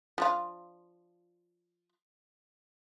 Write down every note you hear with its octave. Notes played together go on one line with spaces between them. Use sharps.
F3 D4 F4